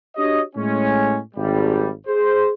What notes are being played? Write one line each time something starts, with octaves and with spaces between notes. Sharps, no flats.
D4 F#4 G4 C#5 D#5
A2 G#3 C#4
G#1 G3
G#4 C5